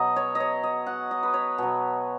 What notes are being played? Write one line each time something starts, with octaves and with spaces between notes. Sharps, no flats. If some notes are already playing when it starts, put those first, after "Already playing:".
Already playing: B2 F#3 D#5
C#5
C#5 D#5
D#5
F#5
D#5
B4
C#5
B2 F#3